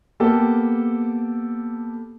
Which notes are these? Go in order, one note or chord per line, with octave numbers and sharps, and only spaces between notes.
A#3 B3 G4 A4